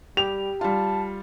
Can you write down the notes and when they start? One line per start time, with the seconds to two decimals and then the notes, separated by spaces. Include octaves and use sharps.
0.17 G3 G4 F7
0.61 G3 F4 A5